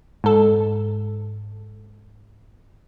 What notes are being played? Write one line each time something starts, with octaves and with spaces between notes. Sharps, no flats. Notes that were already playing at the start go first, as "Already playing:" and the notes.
G#2 A4